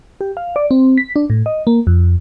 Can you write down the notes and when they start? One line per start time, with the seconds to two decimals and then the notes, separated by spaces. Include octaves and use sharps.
0.21 G4
0.37 F5
0.56 D5
0.71 C4
0.98 B6
1.16 D4
1.30 A2
1.46 D#5
1.67 A#3
1.87 F2